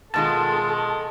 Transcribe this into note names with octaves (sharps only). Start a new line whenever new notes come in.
B2 D#3 G#3 F4 A4 A5